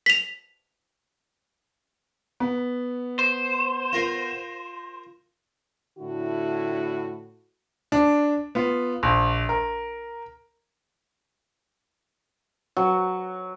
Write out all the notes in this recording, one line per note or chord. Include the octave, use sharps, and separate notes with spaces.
B6 F7
B3
C5
F4 A#4 F5
A2 D3 E4 F#4
D4
B3 F4
A#1
A#4
F#3